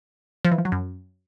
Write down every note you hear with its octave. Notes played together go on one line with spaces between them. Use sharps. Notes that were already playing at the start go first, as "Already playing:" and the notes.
F3
E3
F3
F#3
F#2